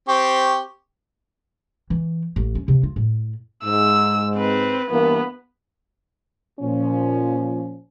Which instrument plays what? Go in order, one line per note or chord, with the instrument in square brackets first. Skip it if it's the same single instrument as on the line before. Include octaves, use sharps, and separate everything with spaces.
[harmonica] C4 G4 C#6
[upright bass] E3
A1
C#4
C3
F4
A2
[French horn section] G#2 [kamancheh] E6
[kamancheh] C4 B4
[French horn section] G2 E3 A#3 [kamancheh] B3
[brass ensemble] A#2 F3 C#4